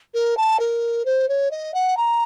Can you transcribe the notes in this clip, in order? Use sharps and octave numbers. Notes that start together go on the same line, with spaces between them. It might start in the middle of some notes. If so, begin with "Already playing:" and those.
A#4
A5
A#4
C5
C#5
D#5
F#5
A#5